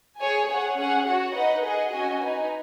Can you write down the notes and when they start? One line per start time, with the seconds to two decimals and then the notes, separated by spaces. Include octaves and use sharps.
0.20 G#4 C#5 G#5
0.49 G#4 C#5 F#5
0.77 C#4 G#4 C#5 F#5
1.06 F#4 C#5 F#5
1.34 D#4 B4 D#5 F#5
1.63 G#4 D#5 F#5
1.92 C#4 F#4 D#5 G#5
2.20 D#4 B4 G#5